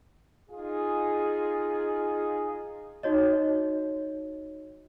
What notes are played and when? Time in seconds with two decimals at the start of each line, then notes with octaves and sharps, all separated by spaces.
0.50 D#4 F4 G#4
3.03 D#4 F#4 C#5 D#5